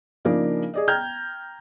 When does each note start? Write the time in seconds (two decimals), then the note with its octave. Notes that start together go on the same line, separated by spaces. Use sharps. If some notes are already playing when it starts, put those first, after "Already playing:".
0.25 C#3 F3 A#3 D4 D#4 A#4
0.74 G#4 D5 D#5
0.88 G5 A#5 F6 G6 G#6